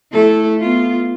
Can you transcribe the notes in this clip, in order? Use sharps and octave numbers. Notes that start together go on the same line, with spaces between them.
A3 E4 A4
B3 F4